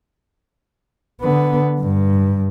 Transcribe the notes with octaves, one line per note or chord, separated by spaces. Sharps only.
D3 B3
G2